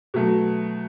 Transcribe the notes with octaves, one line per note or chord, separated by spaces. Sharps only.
B2 F#3 A3